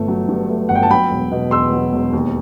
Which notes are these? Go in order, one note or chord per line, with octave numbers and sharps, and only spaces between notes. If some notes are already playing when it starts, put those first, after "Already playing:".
Already playing: G1 A3
F#3
G2
A3
G1 F#5
G5
A5
F#3 G5 B5
E1
B2
E2 C6 E6
F#3
E1
D#2